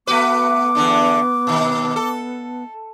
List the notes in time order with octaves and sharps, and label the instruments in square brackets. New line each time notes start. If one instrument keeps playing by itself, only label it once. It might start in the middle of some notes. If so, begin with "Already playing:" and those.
[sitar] A3 F#4 B4 [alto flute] B3 [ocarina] D6
[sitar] E2 D3 D4
B2 D#3
A4